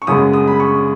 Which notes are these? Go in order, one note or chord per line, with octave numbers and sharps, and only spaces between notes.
C#6
F#2 C#3 G#3 B3 D#6
D#6
B5
C#6